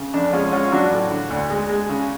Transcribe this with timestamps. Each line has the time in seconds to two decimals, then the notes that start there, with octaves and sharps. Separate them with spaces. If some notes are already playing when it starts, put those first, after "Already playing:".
Already playing: C#3
0.14 F2 D4
0.33 G#3 C#4 F4
0.52 G#3 C#4 F4
0.72 F#3 D4 F#4
0.92 A2
1.11 D3
1.30 D2
1.50 G#3
1.70 G#3
1.89 C#3